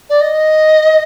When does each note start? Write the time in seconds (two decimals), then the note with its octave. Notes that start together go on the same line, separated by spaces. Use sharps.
0.09 D5
0.20 D#5